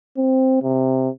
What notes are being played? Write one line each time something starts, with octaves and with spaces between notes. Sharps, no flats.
C4
C3